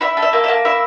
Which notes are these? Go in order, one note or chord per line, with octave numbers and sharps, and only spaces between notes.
E4 E5
A4
E5
A#3
E5
A#3
E4 E5